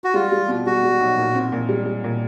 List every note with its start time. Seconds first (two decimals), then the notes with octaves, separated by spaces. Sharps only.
0.04 F#4
0.14 G3 F4
0.32 G3
0.48 B2
0.67 G3 F#4
0.83 G3
1.00 B1
1.17 A#2
1.35 C4
1.52 A#2
1.69 G3
1.86 G3
2.04 A#2